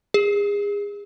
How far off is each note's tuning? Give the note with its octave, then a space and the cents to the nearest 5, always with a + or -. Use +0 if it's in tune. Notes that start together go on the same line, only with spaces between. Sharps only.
G#4 -30